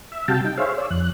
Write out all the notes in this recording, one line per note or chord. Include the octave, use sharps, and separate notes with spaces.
E5
C3 G3 F#4 F5 G5 A5
D#4 G5
G#4 C5 C#5 E5 F5
C#5 D5 E6
F2 F#6